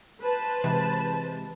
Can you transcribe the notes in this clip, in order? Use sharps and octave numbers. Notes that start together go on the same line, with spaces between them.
B4 C5 A5
C3 E3 G#3